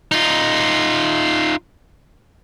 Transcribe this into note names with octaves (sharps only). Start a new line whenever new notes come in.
D#4 F4